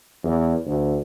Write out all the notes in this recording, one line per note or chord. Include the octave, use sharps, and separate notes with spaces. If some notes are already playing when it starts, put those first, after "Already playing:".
E2
D2